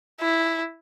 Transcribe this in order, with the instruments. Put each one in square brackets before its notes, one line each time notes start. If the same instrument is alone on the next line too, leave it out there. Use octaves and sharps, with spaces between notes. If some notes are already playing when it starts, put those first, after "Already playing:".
[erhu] E4